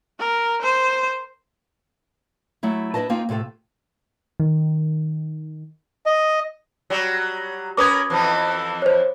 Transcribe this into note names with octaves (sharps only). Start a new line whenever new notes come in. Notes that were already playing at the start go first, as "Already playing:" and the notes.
A#4
C5
F#3 A3 E4
D4 E4 B4 D#5 A5
A#3 C4 D#4 F4
A2 C3 F4 A4
D#3
D#5
F#3 G3
C#4 A#4 B4 D6 D#6 G#6
F2 E3 F3
C5 C#5